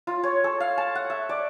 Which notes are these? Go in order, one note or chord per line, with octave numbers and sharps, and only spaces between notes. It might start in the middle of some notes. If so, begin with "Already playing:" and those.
F4
C#5
A4
F5
A5
F#5
E5
D5